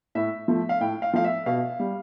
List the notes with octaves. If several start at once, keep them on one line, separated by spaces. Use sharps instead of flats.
A2 E5
F3 A3
F5
A2 G5
F5
F3 A3 F5
E5
B2 F5
G3